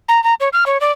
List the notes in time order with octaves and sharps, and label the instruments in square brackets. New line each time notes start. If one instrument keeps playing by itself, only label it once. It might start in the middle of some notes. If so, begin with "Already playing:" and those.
[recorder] A#5
A#5
C#5
F6
C#5
D5